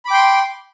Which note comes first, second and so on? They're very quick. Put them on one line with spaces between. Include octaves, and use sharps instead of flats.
B5 D6 G5 C6